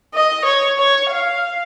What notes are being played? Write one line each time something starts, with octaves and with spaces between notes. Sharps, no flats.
D#5
C#5
C#5
F5